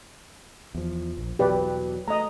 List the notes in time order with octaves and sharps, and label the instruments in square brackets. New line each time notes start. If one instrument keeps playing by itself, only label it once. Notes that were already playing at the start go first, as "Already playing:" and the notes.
[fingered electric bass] E2 F3
A#1
[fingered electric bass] E2 B2 F#3 [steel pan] G4 B4 D5
[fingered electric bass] A3 [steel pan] D#5 A#5